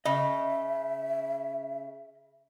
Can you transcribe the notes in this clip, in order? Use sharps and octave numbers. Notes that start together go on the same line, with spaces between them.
C#3 D#5 E5